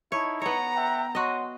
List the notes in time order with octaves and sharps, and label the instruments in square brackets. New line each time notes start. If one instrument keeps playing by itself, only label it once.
[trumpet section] D#4 E4 A5 [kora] C#5
[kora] B3 C#5 [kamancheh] A#5
[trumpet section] E5 F#5 G5
[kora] F#4 D#5 [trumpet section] C#5 F#5 C6